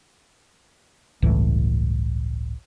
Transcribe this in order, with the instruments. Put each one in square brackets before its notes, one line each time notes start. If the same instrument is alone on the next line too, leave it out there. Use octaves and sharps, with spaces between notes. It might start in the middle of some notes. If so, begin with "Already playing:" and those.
[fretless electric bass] G1 C#2 A2 E3